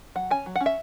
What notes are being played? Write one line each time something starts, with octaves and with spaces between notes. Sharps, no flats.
F#3 F#5
C#4 G#5
F#3
F#5
C#4
E5